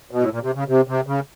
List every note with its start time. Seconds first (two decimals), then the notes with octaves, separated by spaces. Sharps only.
0.11 B2
0.21 A2
0.30 A#2
0.42 C3
0.55 C#3
0.68 C3
0.87 C3
1.07 C#3